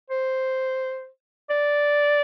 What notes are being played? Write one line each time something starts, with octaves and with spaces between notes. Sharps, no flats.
C5
D5